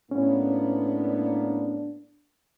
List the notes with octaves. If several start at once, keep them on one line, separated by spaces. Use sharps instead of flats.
A2 A#3 B3 C#4 D4